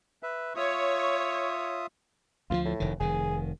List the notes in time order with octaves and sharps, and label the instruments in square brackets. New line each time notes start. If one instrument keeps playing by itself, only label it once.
[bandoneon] B4 E5
[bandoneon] F4 E5 D#6 [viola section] C#5
[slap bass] D2 D#3 F3 [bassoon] F4
[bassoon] A2
[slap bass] F1 D#3
[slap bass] F1 D#3 [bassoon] G#4